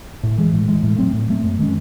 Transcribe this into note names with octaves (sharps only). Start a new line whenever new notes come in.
A2
E3 G#3
A2
E3 G#3
A2
F#3 A3 C4
A2
F#3 A3 C4
F#2
D#3 G#3 C#4